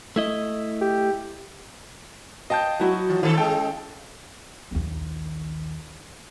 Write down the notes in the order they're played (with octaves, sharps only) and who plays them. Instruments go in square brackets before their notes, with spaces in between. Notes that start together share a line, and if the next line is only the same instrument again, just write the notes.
[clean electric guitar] A3 E4 D#5
[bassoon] G4
[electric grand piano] D#5 A5 G6 [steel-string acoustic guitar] F5 G5
[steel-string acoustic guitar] F#3 E4 F#4
[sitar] E3
[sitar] D#3 A4 [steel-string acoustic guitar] C#4 F5
[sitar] G#3 [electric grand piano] A4 G5
[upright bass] A#1 D#2